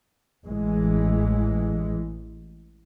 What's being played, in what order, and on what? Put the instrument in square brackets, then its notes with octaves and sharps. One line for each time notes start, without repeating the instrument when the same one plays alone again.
[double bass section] A1 E3 G#3